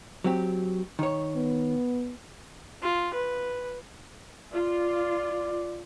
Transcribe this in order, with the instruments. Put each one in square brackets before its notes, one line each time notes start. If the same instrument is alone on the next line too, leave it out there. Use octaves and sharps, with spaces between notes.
[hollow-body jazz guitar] F#3 C4 G4
D#3 C#5
[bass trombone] B3
[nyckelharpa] F4
B4
[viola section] F4 [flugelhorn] D5